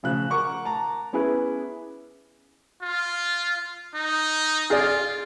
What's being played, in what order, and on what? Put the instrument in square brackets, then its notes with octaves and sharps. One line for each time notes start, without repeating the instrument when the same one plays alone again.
[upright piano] A1 C#3 F3 F#6
A#4 F#5 C#6 D6
A5 A#5
B3 C#4 E4 G#4 B4
[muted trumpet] F4
D#4
[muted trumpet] F4 [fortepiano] G#4 D5